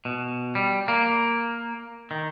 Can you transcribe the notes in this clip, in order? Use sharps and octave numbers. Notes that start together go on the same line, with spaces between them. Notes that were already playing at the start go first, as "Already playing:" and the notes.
B2
G3
A#3
D#3